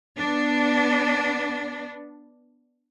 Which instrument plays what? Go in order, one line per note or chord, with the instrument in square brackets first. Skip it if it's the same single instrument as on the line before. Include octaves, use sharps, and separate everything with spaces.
[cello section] B3 D4